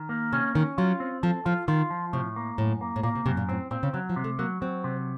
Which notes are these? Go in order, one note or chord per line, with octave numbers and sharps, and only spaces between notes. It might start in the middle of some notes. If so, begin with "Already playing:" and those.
Already playing: D#3
A#3
C3 C#4
D#3 C#4
F#3 F4
C4
F3 A4
F3 F4
D#3 F4
F3
A2 C3
A#3
F#2 A2
A#3
A2
A#2 A#3
C3
F#2 C3
A#2
A2 C4
A#2 C4
C#3
C#3 F#3
F3
C3
A3
F#3 A#3
F#3 C4
C3